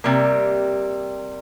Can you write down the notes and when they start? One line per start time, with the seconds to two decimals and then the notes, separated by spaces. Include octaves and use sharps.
0.04 C3 G3 A#3